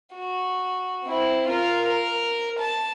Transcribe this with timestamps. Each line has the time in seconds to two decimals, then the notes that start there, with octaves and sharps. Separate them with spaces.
0.15 F#4
1.05 C4 E4
1.48 F4 A#4
1.89 A#4
2.59 A5